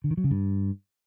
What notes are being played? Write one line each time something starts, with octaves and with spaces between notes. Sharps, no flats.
D3
D#3
F#3
C#3
G2